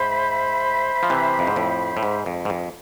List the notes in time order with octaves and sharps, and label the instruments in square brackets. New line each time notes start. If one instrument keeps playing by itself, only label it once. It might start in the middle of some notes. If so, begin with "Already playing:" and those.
Already playing: [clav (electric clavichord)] G#2 [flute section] C5 E5 B5
[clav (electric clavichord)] F3
C3 E3
F2
G#2
F2 A2
A2
G#2
F2
G#2
F2